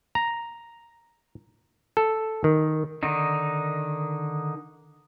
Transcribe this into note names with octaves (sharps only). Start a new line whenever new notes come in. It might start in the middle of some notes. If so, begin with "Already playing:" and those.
A#5
A4
D#3
D3 D#3 D#4